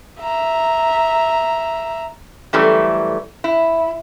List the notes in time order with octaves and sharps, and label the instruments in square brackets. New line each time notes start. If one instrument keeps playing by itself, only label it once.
[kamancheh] E5 A#5
[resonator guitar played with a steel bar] F#2 E3 G3 A3
E4